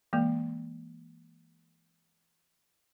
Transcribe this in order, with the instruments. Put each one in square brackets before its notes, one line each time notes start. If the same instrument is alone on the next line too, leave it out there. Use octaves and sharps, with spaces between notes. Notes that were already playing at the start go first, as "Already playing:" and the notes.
[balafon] E3 G#3 A#3